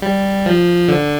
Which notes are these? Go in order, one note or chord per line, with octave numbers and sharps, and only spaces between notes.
G3
F3
D3